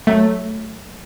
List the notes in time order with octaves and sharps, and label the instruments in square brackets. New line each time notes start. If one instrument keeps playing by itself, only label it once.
[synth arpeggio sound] F#3 A3